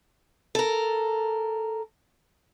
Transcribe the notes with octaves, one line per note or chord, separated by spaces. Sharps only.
A4 A#4